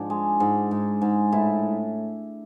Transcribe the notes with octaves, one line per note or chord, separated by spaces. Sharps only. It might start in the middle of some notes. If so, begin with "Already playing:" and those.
Already playing: G#2 F3 D4
G#3
G#2
G#2
G#2
A2 E4